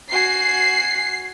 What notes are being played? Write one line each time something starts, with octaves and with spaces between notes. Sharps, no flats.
F#4 G#5 C7